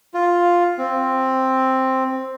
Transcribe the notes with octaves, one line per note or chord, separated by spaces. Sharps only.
F4
C4